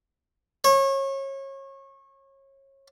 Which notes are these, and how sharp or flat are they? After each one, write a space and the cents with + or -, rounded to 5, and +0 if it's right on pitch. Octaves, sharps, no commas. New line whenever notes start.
C#5 -30